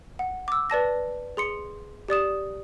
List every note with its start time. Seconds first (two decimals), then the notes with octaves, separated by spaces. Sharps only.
0.19 F#5
0.48 D6 E6
0.70 B4 D5 A5 A#6
1.37 G#4 C6 C#7
2.08 G4 D5 D#6 E7